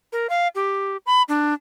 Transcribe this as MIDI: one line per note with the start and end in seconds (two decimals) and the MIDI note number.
0.12 0.27 70
0.30 0.48 77
0.55 0.97 67
1.06 1.22 83
1.29 1.54 62